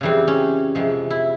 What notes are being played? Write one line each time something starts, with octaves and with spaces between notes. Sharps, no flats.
F2 C#3 E3 G3 C4
C#4
F2 C3 F3 G#3
E4